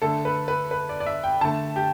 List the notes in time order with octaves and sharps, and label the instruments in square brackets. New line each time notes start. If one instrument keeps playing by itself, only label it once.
[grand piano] D3 A3 A4
B4
B4
B4
D5
D5
E5
G5
D3 A3 A5
G4